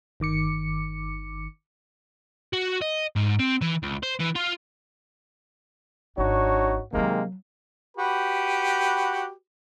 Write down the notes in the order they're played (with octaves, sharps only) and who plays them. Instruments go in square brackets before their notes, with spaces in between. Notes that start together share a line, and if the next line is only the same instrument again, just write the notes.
[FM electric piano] G1 D#3 D6 C#7
[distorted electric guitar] F#4
D#5
G#2
C4
E3
C#2
C5
E3
F4
[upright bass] G#1 [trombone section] D4 D#4 F#4 [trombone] C#5
[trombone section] C3 D#3 A#3 [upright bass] F3 F#3 [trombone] G#3
[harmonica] F#4 G4 B4